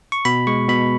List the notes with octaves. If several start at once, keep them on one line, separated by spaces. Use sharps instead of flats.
C#6
B2 B5
G#3 C#6
B2 B5